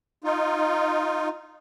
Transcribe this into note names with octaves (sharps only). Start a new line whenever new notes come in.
D#4 F4